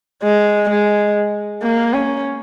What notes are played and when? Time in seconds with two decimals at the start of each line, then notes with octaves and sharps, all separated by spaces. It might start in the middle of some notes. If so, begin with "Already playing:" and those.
0.24 G#3
0.70 G#3
1.62 A#3
1.93 C#4